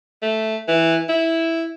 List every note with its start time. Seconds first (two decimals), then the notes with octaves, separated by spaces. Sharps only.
0.22 A3
0.68 E3
1.09 E4